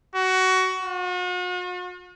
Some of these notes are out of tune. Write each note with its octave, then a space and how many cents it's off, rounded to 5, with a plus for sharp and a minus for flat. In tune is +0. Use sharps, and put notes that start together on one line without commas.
F#4 +20
F#4 -45